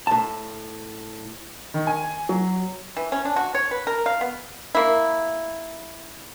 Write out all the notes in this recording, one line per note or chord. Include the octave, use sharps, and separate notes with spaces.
A2 A5
D#3
G#5
F#3
E3
C#4
D4
F#4
C#5
B4
A#4
F5
B3
A#3 E4